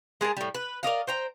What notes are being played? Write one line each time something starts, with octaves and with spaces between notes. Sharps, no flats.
G#3 G#4 A#4 A5
A2 G3
B4
A#4 D5 D#5 F5
C5 G5 A#5